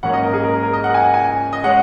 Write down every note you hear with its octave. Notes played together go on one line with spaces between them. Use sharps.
G#2 F#3 A#3 C#4 F#5
D#5
A#4
G#4
A#4
A#4
D#5
F#5
G#5
F#5
G#5
D#5
G#3 C#4 F#5